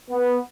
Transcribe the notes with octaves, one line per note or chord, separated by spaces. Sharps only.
B3